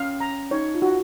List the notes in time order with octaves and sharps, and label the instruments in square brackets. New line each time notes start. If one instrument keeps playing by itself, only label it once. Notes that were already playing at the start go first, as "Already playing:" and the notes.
Already playing: [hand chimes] C#4 [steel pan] F5
[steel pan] A#5
[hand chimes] D#4 [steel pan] C#5
[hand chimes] F4
[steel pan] F#4